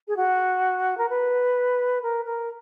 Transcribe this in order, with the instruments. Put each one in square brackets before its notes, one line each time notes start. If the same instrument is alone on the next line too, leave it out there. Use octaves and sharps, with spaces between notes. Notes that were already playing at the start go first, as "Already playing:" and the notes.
[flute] G#4
F#4
A#4
B4
A#4
A#4